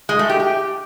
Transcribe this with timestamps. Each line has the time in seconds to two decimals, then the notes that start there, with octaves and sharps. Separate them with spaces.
0.09 G#3
0.19 A3
0.29 G4
0.40 G4